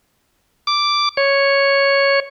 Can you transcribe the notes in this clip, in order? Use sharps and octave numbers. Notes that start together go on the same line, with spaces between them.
D6
C#5